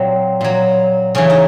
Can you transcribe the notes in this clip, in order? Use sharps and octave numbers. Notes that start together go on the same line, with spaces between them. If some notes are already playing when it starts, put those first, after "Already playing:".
Already playing: A#2 F#3 C4
A#2 F#3
C#3 E3 C#4
D#4